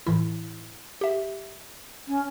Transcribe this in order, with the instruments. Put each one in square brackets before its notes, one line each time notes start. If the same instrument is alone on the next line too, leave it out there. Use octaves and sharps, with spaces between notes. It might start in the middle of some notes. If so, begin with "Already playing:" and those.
[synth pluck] A2 E3 E4
G4 E5
[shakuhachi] C#4